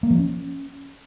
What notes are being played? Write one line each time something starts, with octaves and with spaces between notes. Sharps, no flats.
A#3
F3
C#4